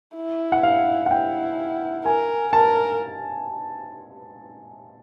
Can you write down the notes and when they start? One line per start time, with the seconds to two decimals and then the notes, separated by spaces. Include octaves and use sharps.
0.16 E4
0.52 F#5
0.63 F5
1.06 F#5
1.11 E4 G5
2.05 A#4 G#5
2.53 A#4 A5